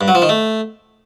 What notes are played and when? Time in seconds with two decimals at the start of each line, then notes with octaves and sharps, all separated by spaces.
0.01 G2
0.08 F#3
0.15 F3
0.22 D#3
0.29 A3